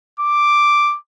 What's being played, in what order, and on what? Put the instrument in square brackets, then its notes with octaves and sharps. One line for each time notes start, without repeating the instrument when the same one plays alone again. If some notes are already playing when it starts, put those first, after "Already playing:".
[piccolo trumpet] D6